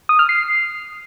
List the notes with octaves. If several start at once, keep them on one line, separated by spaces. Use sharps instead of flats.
D#6
F6
C7